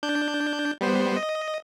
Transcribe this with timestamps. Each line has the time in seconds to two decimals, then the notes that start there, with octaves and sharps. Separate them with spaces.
0.03 D4 G6
0.81 G3 B3 C5
1.16 D#5